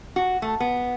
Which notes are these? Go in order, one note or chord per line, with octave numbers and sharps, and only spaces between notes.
F#4
A3
B3